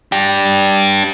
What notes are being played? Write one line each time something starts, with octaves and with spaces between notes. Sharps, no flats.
D4 G4